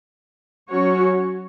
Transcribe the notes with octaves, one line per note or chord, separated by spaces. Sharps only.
F#3 C#4 F#4 C#5